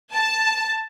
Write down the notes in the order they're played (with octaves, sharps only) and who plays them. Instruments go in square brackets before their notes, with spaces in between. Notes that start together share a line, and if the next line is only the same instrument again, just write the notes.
[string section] A5